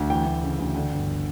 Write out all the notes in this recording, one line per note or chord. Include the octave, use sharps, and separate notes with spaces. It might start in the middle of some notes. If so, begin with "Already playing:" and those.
Already playing: D2
E3 G5
D2
C#3
D2
D3
G1